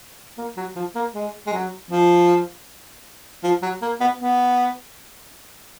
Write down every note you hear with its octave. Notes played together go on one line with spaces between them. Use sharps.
A#3
F#3
F3
A#3
G#3
G#3
F#3
F3
F3
F#3
A#3
B3
B3